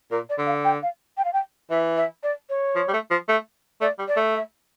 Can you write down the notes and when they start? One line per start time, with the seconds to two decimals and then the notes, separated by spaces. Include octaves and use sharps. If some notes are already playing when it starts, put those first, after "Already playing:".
0.11 A#2 A#4
0.29 D5
0.38 D3
0.47 F5
0.64 G5
0.82 F5
1.18 G5
1.25 F5
1.33 G5
1.70 E3 E5
1.97 E5
2.23 D5
2.49 C#5
2.76 F3
2.88 G3
2.94 A3
3.11 F3
3.29 A3
3.81 A3 D5
3.99 G3
4.08 D5
4.17 A3
4.35 E5